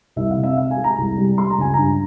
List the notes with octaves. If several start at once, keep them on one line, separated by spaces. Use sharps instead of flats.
C2 E5
F5
C3
E5
G#3 F5
G#5
G#3
A#5
C2
G3
G#3 C6
A#5
C#2 G#5
G2 A#5